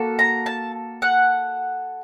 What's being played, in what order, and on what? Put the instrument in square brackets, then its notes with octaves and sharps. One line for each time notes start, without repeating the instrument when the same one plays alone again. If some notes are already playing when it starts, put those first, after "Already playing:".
Already playing: [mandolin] A#3 F#4 A4
A#5
A5
F#5